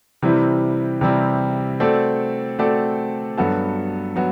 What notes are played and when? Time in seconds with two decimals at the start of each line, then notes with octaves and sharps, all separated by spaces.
0.22 C3 E3 G3 C4 E4
1.01 C3 E3 G3 C4 E4
1.80 A3 C4 F#4 A4 D5
2.59 A3 C4 F#4 A4 D5
3.37 G2 F#3 B3 F#4 A4
4.16 F#3 B3 F#4